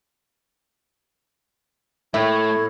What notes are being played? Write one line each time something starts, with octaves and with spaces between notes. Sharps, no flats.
A2 A3 E4 C#5 E5 G5